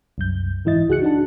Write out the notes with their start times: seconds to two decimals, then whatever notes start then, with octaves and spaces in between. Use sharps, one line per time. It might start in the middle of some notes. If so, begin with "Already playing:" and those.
0.18 C2 F#2 G6
0.65 G#2 E3 E4 D#5 A6
0.89 C#2 F#4 G#4 F#6 C#7
1.02 D4 D#4 F#4 A5